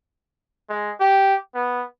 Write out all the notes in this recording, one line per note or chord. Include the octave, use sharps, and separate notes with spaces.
G#3
G4
B3